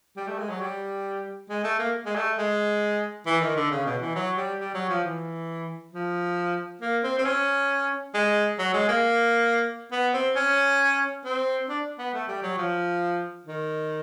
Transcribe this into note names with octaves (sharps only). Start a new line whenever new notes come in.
G3
A3
G#3
F#3
G3
G#3
A3
A#3
G#3
A3
G#3
E3
D#3
D3
C#3
B2
E3
F#3
G3
G3
F#3
F3
E3
F3
A#3
C4
C4
C#4
G#3
F#3
G#3
A#3
B3
C4
C#4
C4
D4
B3
A3
G3
F#3
F3
D#3